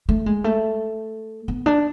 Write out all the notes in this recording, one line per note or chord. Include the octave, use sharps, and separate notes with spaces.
A3
G#3
A3
B3
D4